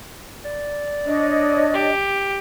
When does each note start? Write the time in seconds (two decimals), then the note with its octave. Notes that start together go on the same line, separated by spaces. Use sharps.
0.45 D5
1.05 D4 C#5 D#5
1.74 G4